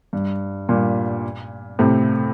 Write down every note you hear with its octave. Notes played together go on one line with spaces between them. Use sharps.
G2
G2 A#2
A2 C3